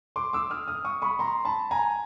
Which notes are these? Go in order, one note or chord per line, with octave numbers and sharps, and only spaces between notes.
C6 D6
D6 E6
D#6 F6
D#6 F6
C#6 D#6
B5 C#6
A#5 C6
A5 B5
G#5 A#5